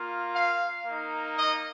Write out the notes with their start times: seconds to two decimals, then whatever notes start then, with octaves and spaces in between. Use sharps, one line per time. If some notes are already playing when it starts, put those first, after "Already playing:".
Already playing: A#3 F4
0.35 F5
0.86 A#3 D#4
1.38 D#5